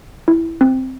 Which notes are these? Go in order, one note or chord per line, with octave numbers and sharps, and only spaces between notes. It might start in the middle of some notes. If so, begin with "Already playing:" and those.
E4
C4